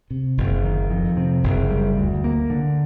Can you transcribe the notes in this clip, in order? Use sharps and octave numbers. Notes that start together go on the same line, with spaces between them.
C3
F#1
D#3
F2
C3
F#1
G3
D2
A#3
D3